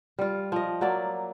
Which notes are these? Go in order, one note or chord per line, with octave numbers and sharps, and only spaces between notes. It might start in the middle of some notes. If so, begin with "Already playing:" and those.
G3 F4
F3 D#5
F#3 A#3 D5 E5